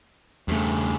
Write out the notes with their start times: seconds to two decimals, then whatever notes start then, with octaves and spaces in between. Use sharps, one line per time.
0.48 E2 G2 C#3 A3